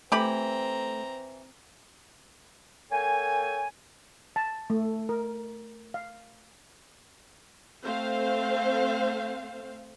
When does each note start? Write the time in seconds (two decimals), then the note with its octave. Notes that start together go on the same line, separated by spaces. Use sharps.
0.12 E3 A3 C4 G4 A#5 B5
2.91 A#3 A4 C#5 G5 G#5
4.36 A5
4.70 A3
5.09 A#4
5.94 F5
7.82 A3 C4 C5 F5